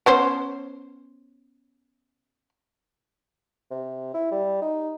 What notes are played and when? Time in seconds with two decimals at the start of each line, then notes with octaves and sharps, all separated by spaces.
0.06 B3 C#4 C5
3.71 C3
4.14 E4
4.32 G3
4.62 D#4